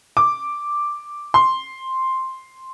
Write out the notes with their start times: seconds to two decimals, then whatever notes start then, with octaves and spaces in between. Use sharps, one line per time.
0.17 D6
1.34 C6